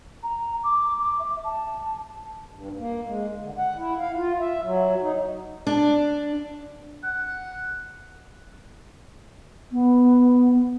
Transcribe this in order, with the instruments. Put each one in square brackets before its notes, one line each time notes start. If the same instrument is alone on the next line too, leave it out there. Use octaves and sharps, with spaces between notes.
[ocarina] A#5
D6
D6
E5
A5
[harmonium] G2
A#3
G#3
D3
F#5
E4
F5
F4
E5
F#3
D#4
[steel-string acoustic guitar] D4
[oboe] F#5
[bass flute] B3